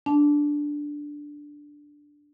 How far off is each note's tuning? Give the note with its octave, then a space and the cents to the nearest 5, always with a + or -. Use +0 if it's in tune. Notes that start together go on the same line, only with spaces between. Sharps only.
D4 +0 A5 -20